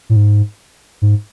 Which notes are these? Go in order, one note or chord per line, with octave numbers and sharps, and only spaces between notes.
A2
G#2
G#2